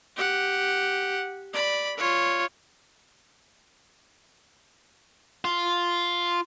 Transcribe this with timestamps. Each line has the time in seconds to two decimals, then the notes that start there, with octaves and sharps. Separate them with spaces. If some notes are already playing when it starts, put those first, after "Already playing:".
0.17 G4 F#5
1.54 D5 B5
1.97 F4 C#5
5.45 F4